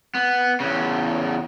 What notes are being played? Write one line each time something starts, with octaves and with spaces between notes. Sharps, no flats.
B3
E2 C#3